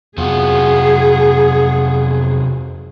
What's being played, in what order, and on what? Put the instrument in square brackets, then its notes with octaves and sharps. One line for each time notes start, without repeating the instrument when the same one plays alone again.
[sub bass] F2 [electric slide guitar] C3 F#3 F4 [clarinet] B3 [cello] G#4